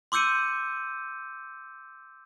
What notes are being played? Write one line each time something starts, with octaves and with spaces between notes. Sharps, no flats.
C6 D6 E6 G6 C#7 D#7